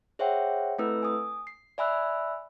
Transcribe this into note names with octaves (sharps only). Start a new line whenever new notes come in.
G#4 C5 C#5 E5 F#5 G5
A3 C4 E4 A4 B4 E6
G#5 D#6
C7
D5 E5 G#5 B5 E6 F#6